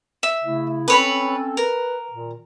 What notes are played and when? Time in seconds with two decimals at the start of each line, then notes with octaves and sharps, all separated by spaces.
0.23 E5
0.43 C#3 A3 E4
0.88 C4 C#4 A4 B4 C#5 B5
1.57 A#4 B4
2.10 A#2 D#3